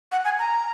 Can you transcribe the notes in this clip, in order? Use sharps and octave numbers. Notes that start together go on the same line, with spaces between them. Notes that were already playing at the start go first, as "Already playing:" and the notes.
F#5
G#5
A#5